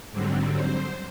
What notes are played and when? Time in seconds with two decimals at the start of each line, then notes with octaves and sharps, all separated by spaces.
0.12 G#2 D3 F#3 G3 C4
0.60 C5